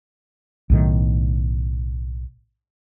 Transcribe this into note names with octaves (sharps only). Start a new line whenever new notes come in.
B1 A2 D#3